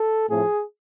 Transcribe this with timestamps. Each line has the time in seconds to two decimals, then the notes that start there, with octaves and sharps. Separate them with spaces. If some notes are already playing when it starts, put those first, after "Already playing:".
Already playing: A4
0.29 A2 F3 A3 C4 G#4